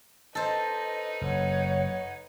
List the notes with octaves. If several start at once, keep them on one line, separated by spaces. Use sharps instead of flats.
D#4 A4 B4 C5 D#5
F#1 C#5 F#5